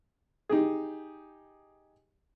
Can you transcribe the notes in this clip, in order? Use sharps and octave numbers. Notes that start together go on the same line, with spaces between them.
D#4 G4 G#4